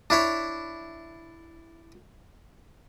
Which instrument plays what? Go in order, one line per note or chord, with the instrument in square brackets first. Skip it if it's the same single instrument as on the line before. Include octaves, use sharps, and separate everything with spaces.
[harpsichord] D4 E4 C#5